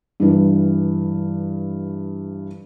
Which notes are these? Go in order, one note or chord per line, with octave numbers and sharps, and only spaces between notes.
G2 E3